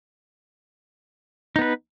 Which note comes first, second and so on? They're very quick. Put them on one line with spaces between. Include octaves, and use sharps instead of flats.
D#4 B3 B4